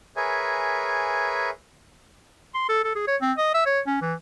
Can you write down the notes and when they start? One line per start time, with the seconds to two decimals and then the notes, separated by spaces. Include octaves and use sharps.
0.17 G#4 A#4 B4 C#5 E5 G#5
2.54 C6
2.69 A4
2.84 A4
2.96 G#4
3.07 C#5
3.21 C4
3.38 D#5
3.54 E5
3.66 C#5
3.87 C#4
4.02 E3